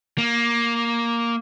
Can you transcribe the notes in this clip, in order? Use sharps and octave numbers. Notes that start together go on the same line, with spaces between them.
A#3